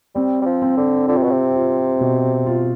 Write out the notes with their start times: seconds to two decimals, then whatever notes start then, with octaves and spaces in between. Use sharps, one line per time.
0.15 G3 C4
0.42 G3
0.46 F3
0.62 C4
0.77 D3
1.07 D3 F4
1.16 C3
1.23 B2
1.32 C3
1.54 F4
2.00 B2
2.46 F4